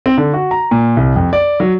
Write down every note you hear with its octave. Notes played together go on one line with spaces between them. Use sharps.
C4
D3
F#4
A#5
A#2
C2
F2
D5
F#3